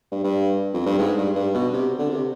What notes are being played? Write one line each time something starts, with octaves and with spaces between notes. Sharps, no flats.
G2
G2
F2
G2
G#2
G2
G2
B2
C3
D3
C3